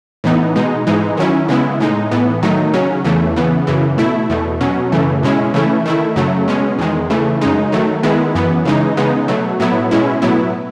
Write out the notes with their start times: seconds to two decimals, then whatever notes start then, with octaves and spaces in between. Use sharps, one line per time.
0.24 A2 E3 B3 D#4
0.56 B2 G#3 D#4
0.87 G#2 E3 G#3 D#4
1.17 D#3 F#3 C#4 E4
1.49 C#3 G#3 B3 E4
1.80 A2 G#3 D#4
2.11 A2 E3 B3
2.43 D#3 F#3 A3 D#4
2.74 C#3 F#3 C#4
3.04 E2 C#3 E3 A3
3.36 C#3 E3 B3
3.67 F#2 C#3 E3
3.98 B2 A3 E4
4.29 E2 B2 A3
4.61 B2 F#3 C#4
4.92 F#2 C#3 E3 A3
5.23 B2 G#3 C#4 E4
5.54 C#3 E3 A3 C#4 E4
5.86 D#3 A3 E4
6.16 F#2 C#3 F#3 A3
6.48 B2 G#3 C#4
6.78 E2 D#3 G#3
7.10 C#3 E3 A3
7.41 F#2 C#3 G#3 D#4
7.72 D#3 F#3 A3
8.03 D#3 G#3 B3 E4
8.35 F#2 E3 B3
8.65 C#3 E3 G#3 D#4
8.97 C#3 G#3 B3 D#4
9.28 B2 F#3 A3
9.60 A2 F#3 B3 E4
9.91 B2 G#3 C#4 E4
10.22 A2 F#3 B3 E4